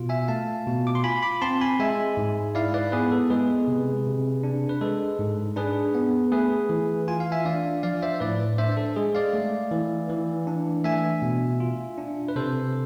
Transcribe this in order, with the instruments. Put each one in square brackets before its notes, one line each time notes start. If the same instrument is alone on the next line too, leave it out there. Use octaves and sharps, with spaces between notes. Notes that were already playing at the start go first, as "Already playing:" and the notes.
Already playing: [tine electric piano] B2 F4
E5 G#5
A3 F5 A5
B2
D6
C6
F4 G#5 B5
B5 D6
C4 A5 C6
G#5 B5
G#3 E5 G#5
G#2
E4 D5 F5
B4 D5
B3 G#4 B4
A4
G#3 G#4 B4
C3
C3
D4
B4
G#3 A4
G#2
D4 G#4 B4
B3
A3 G#4 B4
E3
F4 G#5
F5
E5 G#5
D4 D5 F5
F3 D5 F5
C5 E5
A2 B4 D5
D4 C5 E5
A4
G#3 G#4
D5 F5
A3
E3
E3
D4
A3 E5 G#5
B2
F4
D4
B4
C3 A4 C5